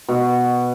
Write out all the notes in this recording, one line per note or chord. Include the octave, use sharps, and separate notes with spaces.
B2